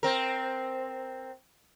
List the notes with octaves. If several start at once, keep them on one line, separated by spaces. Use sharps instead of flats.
C4 A#4